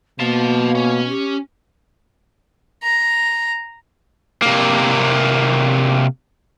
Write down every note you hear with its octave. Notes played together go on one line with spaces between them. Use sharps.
B2 A#3 F5 A5
C#4
G4
A#5
C3 A#3